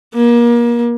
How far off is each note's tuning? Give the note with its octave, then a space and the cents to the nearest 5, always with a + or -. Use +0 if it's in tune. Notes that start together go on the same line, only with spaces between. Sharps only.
A#3 +30